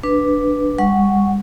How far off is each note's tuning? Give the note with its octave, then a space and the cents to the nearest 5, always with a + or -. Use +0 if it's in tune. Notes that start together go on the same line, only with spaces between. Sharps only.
D4 +0 B4 +0
G3 +40 F#5 +0 C#6 +0